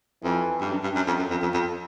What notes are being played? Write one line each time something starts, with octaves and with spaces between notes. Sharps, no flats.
F2 E3
G2
F#2
G2
F#2
F2
F#2
F2
F2
F2